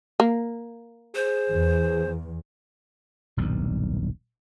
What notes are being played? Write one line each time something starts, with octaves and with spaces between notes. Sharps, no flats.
A#3
G#4 C5
E2
D#1 B1 G2